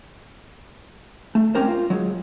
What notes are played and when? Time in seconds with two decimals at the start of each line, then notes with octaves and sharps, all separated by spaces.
1.35 A3
1.55 G#3 C4 C#4 G4 A#4 C5
1.68 F4
1.90 F#3 G#3